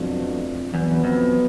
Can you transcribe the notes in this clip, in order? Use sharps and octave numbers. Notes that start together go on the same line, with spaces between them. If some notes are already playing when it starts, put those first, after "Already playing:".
Already playing: F2 B2 F#3 A3 D4
E2 B2 F#3 B3
F2